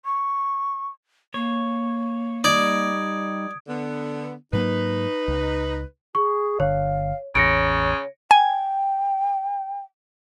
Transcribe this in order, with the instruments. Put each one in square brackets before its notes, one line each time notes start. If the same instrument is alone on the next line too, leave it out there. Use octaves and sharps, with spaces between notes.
[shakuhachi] C#6
[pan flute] A#3 [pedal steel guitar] C#5
[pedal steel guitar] G3 D#4 [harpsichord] D5 [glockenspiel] D#6 G#6 D7
[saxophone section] D3 B3
[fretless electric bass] G#2 F#3 A#3 [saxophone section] D#4 B4
[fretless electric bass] C#2
[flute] G#4 [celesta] C#6
[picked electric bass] G1 D3 [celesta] C#5 [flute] F5
[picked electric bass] A1 E2 [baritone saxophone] C#3 [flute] C#5 [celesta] A#6 C#7 D7
[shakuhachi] G5 [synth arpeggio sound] G#5